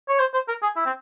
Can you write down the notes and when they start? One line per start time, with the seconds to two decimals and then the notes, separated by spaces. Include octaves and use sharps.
0.09 C#5
0.20 C5
0.34 C5
0.48 A#4
0.62 G#4
0.77 E4
0.86 C4